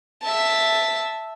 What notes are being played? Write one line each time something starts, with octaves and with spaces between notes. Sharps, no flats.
E5 A5